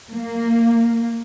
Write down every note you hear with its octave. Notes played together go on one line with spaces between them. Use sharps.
A#3